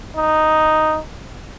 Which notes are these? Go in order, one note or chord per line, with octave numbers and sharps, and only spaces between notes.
D#4